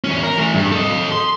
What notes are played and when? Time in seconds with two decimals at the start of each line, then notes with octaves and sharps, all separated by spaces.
0.04 E2 C#4
0.23 A#4
0.38 E3 A3
0.53 G2
0.72 A4 D#5
1.12 C6